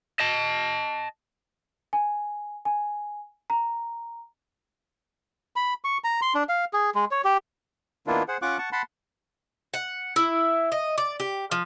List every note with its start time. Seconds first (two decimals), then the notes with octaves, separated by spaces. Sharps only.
0.20 D#5 A5
1.93 G#5
2.65 G#5
3.50 A#5
5.56 B5
5.84 C#6
6.04 A#5
6.22 C6
6.35 D4
6.49 F5
6.73 G#4
6.95 G#3
7.11 C#5
7.24 G4
8.07 D#3 A#3 B3 D4 E4 F4
8.28 G#4 C5 F#5
8.42 C#4 F4 F#5 C#6 D6 F#6
8.58 F#5 A5 C#6
8.72 F#5 A5 B5 C6
9.74 F#5
10.16 E4
10.72 D#5
10.98 D5
11.20 G4
11.52 F3